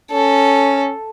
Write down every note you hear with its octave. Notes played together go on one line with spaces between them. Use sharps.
C#4 A4